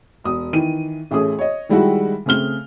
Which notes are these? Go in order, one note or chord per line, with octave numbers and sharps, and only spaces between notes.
E1 D#6
D#3 E3 D#7
A1 A3 C#4 G#4 D#6
C#5 D#5
D#3 G3 G#3 E4 F#4
C#3 A3 C4 F6 G7